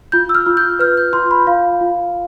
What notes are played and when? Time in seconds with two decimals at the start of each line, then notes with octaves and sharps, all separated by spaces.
0.12 F4 G6
0.29 E6
0.35 F6
0.46 F4
0.57 G6
0.79 B4 F6
0.97 G6
1.13 F4 C6
1.31 B5
1.47 F4 F5
1.81 F4